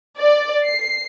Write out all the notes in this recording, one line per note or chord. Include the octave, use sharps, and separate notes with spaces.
D5
C7